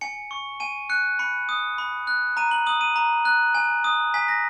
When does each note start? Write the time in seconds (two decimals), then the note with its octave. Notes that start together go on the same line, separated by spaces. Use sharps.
0.01 G#5 C#7
0.31 C#6
0.60 G#5 D#7
0.90 F#6 C#7
1.19 B5 C#7
1.49 D#6
1.78 B5
2.07 F#6
2.37 A#5 D#7
2.51 F#7
2.66 D#6 F#7
2.81 D#7
2.96 A#5
3.25 F#6
3.55 G#5
3.84 D#6
4.14 G#5 B6
4.28 A#6